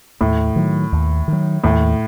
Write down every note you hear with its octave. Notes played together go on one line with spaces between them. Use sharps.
D#2 A2
D#3 F#3
D#2
D#3 F#3
D#2 A2